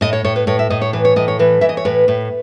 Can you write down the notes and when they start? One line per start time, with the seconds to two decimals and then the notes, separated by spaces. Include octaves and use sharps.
0.01 A2 D#5
0.13 C#5
0.24 A2 C#5
0.36 B4
0.47 A2 C#5
0.59 E5
0.70 A2 D#5
0.82 C#5
0.93 E3 B4
1.05 C#5
1.16 A2 D#5
1.28 C#5
1.39 E3 B4
1.61 E3 E5
1.69 D#5
1.77 C#5
1.85 A2 B4
2.08 A2